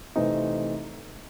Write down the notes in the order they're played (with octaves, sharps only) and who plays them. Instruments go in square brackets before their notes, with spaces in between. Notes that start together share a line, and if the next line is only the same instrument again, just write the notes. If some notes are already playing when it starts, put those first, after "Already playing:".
[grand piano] C3 E3 A3 C4 D#4